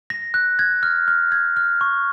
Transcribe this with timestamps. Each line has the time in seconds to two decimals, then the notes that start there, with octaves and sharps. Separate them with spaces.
0.10 A#6
0.34 F#6
0.59 G#6
0.83 F6
1.08 F6
1.32 G#6
1.57 F6
1.81 C#6